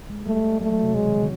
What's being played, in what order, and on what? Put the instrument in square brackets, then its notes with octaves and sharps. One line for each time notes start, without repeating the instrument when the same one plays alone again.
[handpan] G#3
[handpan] G3 [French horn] A3
[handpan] F#3 [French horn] A3
[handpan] F#3
C3
[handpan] B2 [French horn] G#3
[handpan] D#3
D3